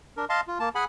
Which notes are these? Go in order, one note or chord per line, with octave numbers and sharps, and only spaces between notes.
D4 A#4
D#5 F5 A5 C6
F4
A#3 A5
G#4 F#5 G#5 B5